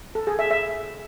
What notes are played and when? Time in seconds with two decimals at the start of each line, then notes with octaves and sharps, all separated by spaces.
0.15 A4
0.27 G#4
0.39 E5
0.51 E5